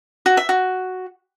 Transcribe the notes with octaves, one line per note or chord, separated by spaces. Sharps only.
F#4
E5
F#4